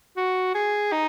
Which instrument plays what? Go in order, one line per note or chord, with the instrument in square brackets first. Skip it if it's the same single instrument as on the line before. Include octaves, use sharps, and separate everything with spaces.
[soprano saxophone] F#4
G#4
D#4